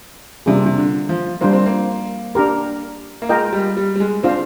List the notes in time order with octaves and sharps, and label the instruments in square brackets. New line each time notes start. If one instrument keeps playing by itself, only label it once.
[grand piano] C3 [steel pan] G3 A#3 D4 F4 G#4
[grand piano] C3
D3
F3
[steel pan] G3 D4 F4 C5 [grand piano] A#3
[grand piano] C4
A#3
[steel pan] D4 G4 A#4
[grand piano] A#3
[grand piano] G#3 [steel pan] F4 A#4 D#5 G5
[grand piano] G3
G3
G3
G#3
[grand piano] C4 [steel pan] D4 F4 C5 F5